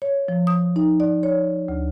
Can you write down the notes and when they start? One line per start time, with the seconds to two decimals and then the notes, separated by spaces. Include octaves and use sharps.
0.02 C#5
0.28 F3
0.47 D#6
0.76 D#4
1.00 D5
1.23 C#5
1.68 D2